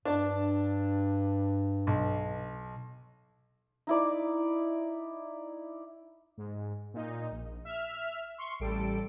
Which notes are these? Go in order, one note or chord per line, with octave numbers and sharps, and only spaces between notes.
G2 D4 A5
B1
D#4 E4 D5
G#2
A#2 D#4
A#1
E5 F6
C6 C#6
A1 G3 A4 D7